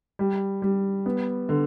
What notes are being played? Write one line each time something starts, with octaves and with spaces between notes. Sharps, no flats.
G3
G3
B3
D3